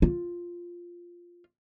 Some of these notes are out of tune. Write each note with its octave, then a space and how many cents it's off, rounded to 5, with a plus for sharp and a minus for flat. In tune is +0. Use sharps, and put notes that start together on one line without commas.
F4 +0